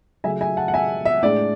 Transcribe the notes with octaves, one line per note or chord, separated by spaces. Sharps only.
C#3 F#3 A3 E5 G#5
E5 G#5
F#5 A5
F#5
E5 G#5
E5
A2 G#3 D4 D5